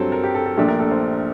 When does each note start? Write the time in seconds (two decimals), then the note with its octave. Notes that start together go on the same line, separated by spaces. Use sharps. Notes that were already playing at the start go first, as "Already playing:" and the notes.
Already playing: G2 F#3 C4 A4
0.12 A#4
0.24 G4
0.35 A4
0.46 A4
0.57 A#1 A#2 A3 D4 G4
0.68 A#4
0.80 A4
0.91 C5